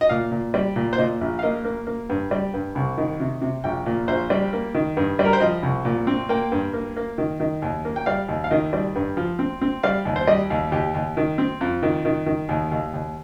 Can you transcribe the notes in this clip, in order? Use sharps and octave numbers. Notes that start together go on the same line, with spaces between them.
D#5
A#2 F5
A#2
G3
A#2
C5
A#2 D#5
A#1
F5
A#3 D#5
A#3
A#3
G2
G3
G2
C2
D#3
C3
C3
A#1 G5
A#2
A#1 C5
G3
A#3
D#3
G2
G3
A#4
C5
F3 D#5
C2
A#2
C4
A#3 G5
G2
A#3
A#3
D#3
D#3
D#2
A#3
G5
G3 F5
D#2
F5
D#3 D#5
G3
G2
F3
C4
C4
G3 F5
D#2
C5
G3 D#5
D#2
D#2 G4
D#2
D#3
C4
F2
D#3
D#3
D#3
D#2
D#2
D#2